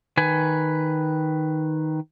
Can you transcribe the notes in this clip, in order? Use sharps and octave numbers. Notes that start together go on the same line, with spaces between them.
D#3 B4 G#5